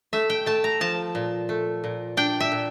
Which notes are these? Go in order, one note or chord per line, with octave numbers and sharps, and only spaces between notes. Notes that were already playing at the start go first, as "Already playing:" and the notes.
A3 E5
G5
A3 A5
A#5
F3 A5
A#2
A3
A#2
D4 G5
E5
A#2